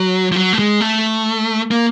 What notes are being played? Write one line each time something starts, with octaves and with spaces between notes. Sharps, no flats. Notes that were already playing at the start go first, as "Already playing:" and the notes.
Already playing: F#3
F3
F#3
A3
G#3
A3
A#3